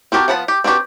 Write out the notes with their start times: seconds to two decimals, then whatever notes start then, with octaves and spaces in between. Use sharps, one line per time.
0.12 C4 F#4 G4 A#4 A5
0.28 F3 B3 F#5 A5 B5
0.48 G4
0.64 C4 D4 F#4 G4 B4